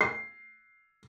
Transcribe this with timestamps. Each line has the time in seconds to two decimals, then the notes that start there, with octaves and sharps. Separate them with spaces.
0.01 C7